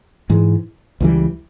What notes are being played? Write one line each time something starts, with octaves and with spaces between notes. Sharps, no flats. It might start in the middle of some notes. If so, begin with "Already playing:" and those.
G#2 E3 G#3
C#2 C#3 E3 G3